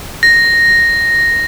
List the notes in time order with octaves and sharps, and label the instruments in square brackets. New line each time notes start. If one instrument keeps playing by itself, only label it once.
[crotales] A#6